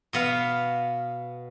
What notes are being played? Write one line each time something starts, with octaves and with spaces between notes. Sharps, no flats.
B2 B3 F5